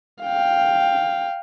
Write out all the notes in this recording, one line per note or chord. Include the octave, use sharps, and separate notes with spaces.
F5 G5